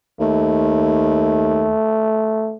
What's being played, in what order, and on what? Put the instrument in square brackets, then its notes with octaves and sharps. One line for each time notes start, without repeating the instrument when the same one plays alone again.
[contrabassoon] D#2 [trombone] A3